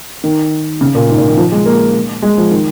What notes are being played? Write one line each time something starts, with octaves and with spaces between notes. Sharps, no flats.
D#3
C#3
A#2
G#2
A#2
D#3
F3
G#3
A#3
G#3
F3
D#3